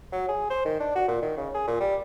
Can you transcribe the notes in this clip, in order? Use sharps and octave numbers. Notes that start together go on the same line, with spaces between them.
F#3
G#4
C5
D#3
D4
F#4
A#2
D#3
C#3
G#4
A#2
G3